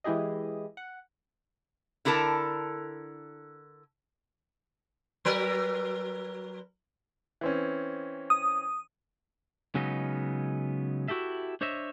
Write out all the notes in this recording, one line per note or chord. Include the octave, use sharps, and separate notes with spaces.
E3 G#3 E4 G4 G#4 D#5
F#5
D3 E4 A4 A#4 A5
F#3 A#4 B4
E3 C4 C#4
D#6
C#3 F#3 G#3 B3 C#4 D#4
E4 F#4 G4 A4 E5
D4 C5 C#5 D#5 E5